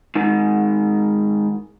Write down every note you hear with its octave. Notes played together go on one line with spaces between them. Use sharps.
G#2 D#3